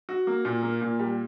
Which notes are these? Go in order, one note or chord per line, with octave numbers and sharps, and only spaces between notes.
F#4
A#3
A#2
A#3
A#2
G3